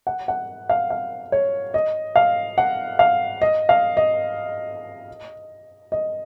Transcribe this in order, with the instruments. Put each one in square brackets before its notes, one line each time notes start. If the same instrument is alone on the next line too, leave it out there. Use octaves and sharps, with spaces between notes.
[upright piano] F#5
F#5
F5
F5
C#5
D#5
F5
F#5
F5
D#5
F5
D#5
D#5